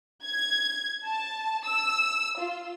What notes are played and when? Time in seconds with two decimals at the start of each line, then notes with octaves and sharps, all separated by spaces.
0.25 G#6
1.06 A5
1.66 E6
2.40 F4